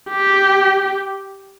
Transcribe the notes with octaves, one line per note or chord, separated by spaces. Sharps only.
G4